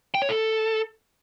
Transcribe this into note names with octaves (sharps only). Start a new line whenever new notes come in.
G5
C#5
A4